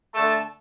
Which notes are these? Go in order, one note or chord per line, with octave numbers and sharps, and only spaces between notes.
D3 A3 A5